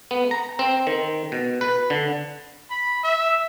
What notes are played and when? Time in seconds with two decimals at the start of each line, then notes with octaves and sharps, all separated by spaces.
0.11 B3
0.31 A#5
0.59 C4
0.87 D#3
1.32 B2
1.61 B4
1.90 D3
2.70 B5
3.03 E5